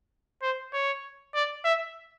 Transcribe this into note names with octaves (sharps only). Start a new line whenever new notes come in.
C5
C#5
D5
E5